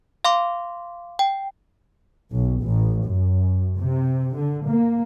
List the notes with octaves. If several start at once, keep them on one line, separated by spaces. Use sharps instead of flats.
F5 C6 D6
G5
B1
A1
F#2
C3
D3
A#3